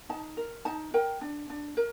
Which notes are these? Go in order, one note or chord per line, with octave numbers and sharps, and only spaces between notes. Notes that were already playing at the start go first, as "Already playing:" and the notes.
D#4 A5
A#4
D#4 A5
A#4 G5
D4
D4
A#4